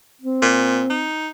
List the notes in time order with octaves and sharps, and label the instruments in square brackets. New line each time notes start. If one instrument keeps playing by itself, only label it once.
[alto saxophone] C4
[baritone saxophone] A#2
D#4